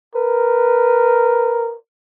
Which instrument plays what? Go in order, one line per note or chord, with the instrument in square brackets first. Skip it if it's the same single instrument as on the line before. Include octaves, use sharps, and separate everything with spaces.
[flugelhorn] A#4 [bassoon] B4